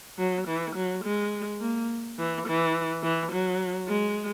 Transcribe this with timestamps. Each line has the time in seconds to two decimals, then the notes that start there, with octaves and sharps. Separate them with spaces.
0.18 F#3
0.47 E3
0.75 F#3
1.04 G#3
1.60 A#3
2.18 E3
2.46 E3
3.03 E3
3.31 F#3
3.88 G#3